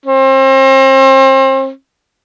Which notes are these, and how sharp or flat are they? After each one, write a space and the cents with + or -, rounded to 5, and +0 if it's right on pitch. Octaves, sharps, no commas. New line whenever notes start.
C4 +35